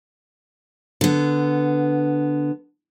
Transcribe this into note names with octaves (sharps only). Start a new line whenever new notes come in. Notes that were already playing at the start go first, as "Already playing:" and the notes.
D3 B3